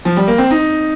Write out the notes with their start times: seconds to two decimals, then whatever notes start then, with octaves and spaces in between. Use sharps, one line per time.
0.05 F3
0.17 G3
0.28 A#3
0.38 C4
0.51 D#4